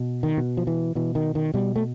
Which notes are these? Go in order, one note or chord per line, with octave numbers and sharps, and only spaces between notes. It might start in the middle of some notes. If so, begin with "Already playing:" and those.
Already playing: B2
D#3
B2
F3
E3
B2 E3
D#3
D#3
B2 G3
A3